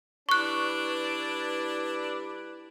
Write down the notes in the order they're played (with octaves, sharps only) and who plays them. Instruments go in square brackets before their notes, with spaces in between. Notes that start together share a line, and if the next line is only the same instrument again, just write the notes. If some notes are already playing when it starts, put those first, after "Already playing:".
[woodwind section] G3 E4 B4 [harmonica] D4 [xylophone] C#6 F#6